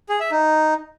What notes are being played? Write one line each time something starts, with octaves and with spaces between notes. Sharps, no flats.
G#4
E5
D#4